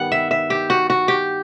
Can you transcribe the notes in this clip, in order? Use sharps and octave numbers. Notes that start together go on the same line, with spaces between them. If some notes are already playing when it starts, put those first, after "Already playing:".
Already playing: G2 D#3 G3 B3 F#5
E5
E5
G4
F#4
F#4
G4